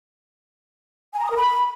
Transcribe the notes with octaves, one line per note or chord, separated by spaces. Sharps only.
G#5
A#5
D#6
A#4
B5